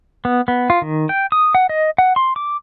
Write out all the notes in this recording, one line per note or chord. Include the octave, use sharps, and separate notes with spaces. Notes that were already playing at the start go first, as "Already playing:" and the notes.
B3
B3
F4
D#3
G5
D#6
F#5
D#5
F#5
C6
D6